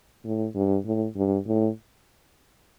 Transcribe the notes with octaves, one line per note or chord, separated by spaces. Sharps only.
A2
G2
A2
G2
A2